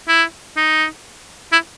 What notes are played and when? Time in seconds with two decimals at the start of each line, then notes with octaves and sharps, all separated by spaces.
0.08 E4
0.57 D#4
1.52 E4